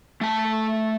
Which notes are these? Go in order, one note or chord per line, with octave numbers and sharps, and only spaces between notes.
A3 A5